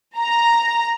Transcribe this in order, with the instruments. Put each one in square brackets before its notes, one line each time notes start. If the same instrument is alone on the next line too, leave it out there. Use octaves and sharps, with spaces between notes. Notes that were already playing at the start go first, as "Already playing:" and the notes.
[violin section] A#5